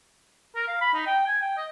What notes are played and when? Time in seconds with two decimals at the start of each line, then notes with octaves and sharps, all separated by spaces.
0.55 A#4
0.67 F5
0.81 B5
0.94 D#4
1.06 G5
1.27 G#5
1.42 G5
1.57 D#5